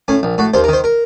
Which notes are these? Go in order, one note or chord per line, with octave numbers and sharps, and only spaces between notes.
A2 C#4
A#1
A2 F#4
D#2 C5
A#4
D#3 C5
A#4